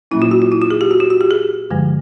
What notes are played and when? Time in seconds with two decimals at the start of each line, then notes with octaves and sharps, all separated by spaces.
0.11 A#2 F#3 A#3 C#4 E4
0.22 F4
0.31 F#4
0.42 F4
0.52 E4
0.62 F4
0.71 G#4
0.81 G4
0.91 F#4
1.00 F4
1.10 F#4
1.21 G4
1.31 G#4
1.70 G2 D3 F3 G#3